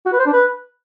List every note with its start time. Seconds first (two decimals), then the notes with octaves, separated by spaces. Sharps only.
0.06 F#4
0.13 B4
0.20 C5
0.26 D4
0.33 B4